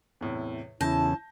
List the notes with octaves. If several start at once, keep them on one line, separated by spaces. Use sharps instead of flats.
E2 A2 C3
E2 C#3 C#4 E4 A5 G6 A#6